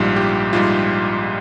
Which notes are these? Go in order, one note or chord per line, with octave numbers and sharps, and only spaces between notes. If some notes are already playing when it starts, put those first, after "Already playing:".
Already playing: A#1 G#2 G3 F4
G4
A#1 G#2 G3 F4